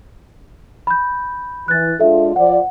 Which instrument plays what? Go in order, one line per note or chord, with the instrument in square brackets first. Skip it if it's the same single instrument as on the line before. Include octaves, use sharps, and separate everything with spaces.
[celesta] B5 G6
[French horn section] E3 [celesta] F#6 A6
[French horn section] G#3 D4 F4 [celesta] A4 E5
[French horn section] F3 D5 [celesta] F#5